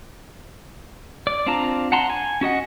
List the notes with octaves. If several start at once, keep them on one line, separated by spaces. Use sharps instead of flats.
D5
C4 D4 F4 A5 A#5
F#5 A5 A#5 C6
G#5
C#4 F#4 D#5 F#5